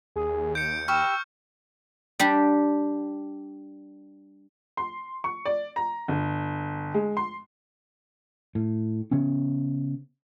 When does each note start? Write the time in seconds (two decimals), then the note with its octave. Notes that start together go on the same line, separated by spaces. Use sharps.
0.16 D#2 G#4
0.55 G6 C#7 D7
0.88 G4 B5 C#6 E6 F6
2.20 G3 D4 G4
4.77 C6
5.24 C#6
5.45 D5
5.76 A#5
6.08 G1
6.94 G#3
7.17 C6
8.55 A2
9.11 C#3 B3 C#4